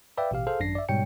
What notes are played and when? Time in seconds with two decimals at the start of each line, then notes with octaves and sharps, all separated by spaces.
0.17 B4 D5 E5 F5 G5
0.31 A1 B2 G4 F5
0.47 G#4 A4 C5 F5
0.60 G#1 F#2 D4 A#6 C7
0.75 D5 E5
0.89 G#2 B2 G3 C#5 G5 C#7